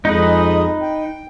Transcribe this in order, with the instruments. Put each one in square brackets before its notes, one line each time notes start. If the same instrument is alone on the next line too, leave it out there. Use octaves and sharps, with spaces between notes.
[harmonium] F2 G#3 D#5 [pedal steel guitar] D#4 B4
[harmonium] G5